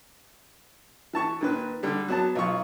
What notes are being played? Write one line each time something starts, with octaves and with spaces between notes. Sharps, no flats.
E3 A5 C#6
A#2 D#3 B4
D3 G3
F#3 B3 A5
B1 F4 C#6